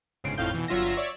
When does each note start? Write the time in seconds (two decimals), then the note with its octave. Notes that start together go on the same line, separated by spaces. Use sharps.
0.24 G1 G#2 C#3 C7 D7
0.38 G#1 F2 A2 F5 G6
0.54 B2 E3
0.68 G1 F#3 F4 E5 A#6
0.97 C#5 D5 E5